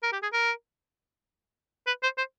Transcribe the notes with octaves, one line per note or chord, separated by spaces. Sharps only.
A#4
G4
G#4
A#4
B4
C5
C5